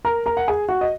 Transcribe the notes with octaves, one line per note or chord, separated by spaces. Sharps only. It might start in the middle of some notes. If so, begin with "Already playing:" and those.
A#4 A#5
A#4 A#5
F#5
G#4 G#5
F#4 F#5
D#5